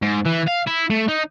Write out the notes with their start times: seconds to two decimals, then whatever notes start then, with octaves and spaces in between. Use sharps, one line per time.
0.02 G#2
0.25 E3
0.47 F5
0.67 E4
0.90 A3
1.08 D#4